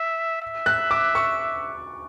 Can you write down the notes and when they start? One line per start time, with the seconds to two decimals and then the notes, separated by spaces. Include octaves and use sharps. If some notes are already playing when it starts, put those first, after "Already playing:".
Already playing: E5
0.42 E5
0.66 F#6
0.91 D6
1.15 C#6